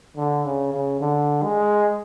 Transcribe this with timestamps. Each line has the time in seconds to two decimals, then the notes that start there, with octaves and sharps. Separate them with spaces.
0.16 D3
0.45 C#3
0.73 C#3
1.01 D3
1.43 G#3